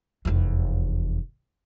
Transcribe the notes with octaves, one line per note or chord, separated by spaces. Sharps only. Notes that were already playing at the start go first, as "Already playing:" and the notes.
F1 E2